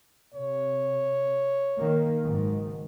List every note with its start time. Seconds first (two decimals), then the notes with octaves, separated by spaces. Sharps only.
0.34 C3 C#5
1.77 D#3 A#3
2.23 F#1 G#2 D#3